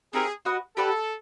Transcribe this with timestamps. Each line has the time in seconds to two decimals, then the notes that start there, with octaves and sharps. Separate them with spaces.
0.13 C4 D#4 G4 G#4 A#4
0.45 F#4 B4 D#5 F#5
0.77 G4 A4 B4 D5 F#5